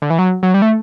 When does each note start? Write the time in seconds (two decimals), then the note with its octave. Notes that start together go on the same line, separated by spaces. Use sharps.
0.02 D3
0.10 E3
0.19 F#3
0.43 F#3
0.54 G3
0.62 A3